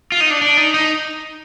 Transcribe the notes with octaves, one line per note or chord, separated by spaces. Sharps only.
F4
D#4
D4
D4
D#4
D#4